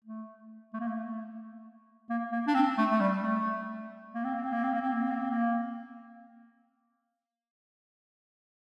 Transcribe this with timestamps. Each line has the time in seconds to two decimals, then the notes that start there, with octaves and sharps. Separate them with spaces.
0.04 A3
0.73 A3
0.80 A#3
0.87 A3
2.10 A#3
2.32 A#3
2.47 D4
2.54 C4
2.78 A3
2.91 A3
3.00 G3
3.22 A3
4.14 A#3
4.24 C4
4.34 A#3
4.43 C4
4.53 A#3
4.63 C4
4.73 A#3
4.82 C4
4.92 A#3
5.02 C4
5.11 A#3
5.21 C4
5.31 A#3